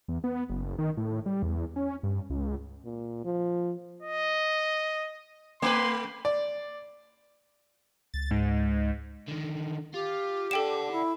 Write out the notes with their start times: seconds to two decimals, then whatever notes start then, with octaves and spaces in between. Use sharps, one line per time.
0.08 E2
0.24 B3
0.50 F#1
0.78 D#3
0.97 A2
1.26 G3
1.42 E2
1.76 C#4
2.03 G2
2.30 C#2
2.85 A#2
3.25 F3
4.02 D#5
5.62 A3 B4 C6
6.25 D5
8.14 C#2 A6
8.31 G#2
9.28 D3 D#3
9.94 F4 G4
10.51 D4 A4 D5 F#5 G5 E7
10.91 E4